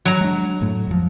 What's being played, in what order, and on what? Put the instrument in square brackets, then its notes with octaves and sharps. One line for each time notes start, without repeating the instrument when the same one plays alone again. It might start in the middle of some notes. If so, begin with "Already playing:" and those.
[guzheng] F#3 A#5
[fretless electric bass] G#3 D4
F#2 A2 A3
F2 A2 F3